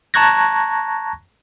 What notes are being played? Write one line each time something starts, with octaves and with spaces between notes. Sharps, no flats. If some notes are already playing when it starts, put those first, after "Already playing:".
A5 A#5 C#6 F#6 G#6 A#6